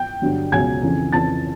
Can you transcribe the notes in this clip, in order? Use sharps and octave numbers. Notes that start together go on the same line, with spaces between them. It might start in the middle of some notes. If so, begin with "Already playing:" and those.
Already playing: G5 G6
G2 D3 F#3
C#2 B2 F#3 G#5 G#6
F2 C#3 E3
F2 C#3 E3 A5 A6